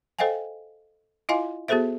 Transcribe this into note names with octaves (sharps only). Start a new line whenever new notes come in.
A4 C5 D#5 F5 G5 G#5
E4 F4 D#5 F5 G#5 C6
B3 F#4 G#4 A4 C5 E5